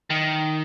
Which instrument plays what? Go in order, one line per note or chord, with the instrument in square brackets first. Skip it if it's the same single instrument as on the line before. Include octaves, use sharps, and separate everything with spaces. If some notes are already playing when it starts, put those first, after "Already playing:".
[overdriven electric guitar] D#3